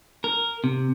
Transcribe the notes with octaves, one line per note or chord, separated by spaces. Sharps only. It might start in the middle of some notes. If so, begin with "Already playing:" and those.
A#4
C3